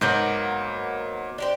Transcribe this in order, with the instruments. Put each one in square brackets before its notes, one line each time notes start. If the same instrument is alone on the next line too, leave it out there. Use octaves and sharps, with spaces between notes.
[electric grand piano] G#2 G6 [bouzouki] F#3 A#3 B3
[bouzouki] D4 G4 C5